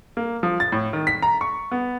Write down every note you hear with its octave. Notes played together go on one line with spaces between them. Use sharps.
A#3
F3
A6
A2
D#3
B6
A#5
C#6
B3